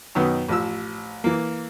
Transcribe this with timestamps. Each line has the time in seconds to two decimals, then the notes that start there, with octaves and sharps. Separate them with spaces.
0.15 F#2 B2 D#3 B3
0.49 A1 F3 E6
1.24 E3 A#3